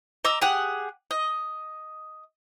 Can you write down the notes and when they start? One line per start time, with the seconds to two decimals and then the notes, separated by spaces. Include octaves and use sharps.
0.24 D#5 A#5 D6 E6
0.42 G4 G#4 F#5
1.11 D#5